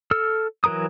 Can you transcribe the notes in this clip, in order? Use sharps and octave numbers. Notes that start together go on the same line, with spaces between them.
A4 E6 F6
E3 F#3 A#4 A#5 D#6